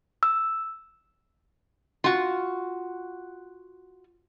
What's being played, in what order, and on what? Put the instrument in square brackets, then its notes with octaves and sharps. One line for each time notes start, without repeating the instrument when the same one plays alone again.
[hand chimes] E6
[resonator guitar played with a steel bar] F4 F#4